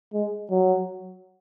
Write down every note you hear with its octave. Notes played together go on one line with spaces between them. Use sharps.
G#3
F#3